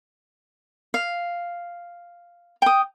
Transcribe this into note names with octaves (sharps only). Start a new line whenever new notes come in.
F5
G5 D#6